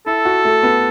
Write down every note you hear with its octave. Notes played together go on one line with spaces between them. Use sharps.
E4 A4
F#4
A3
B3